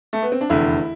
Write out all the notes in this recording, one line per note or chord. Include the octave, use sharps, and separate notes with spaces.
A3
B3
C4
D4
F1 E2 D3 E4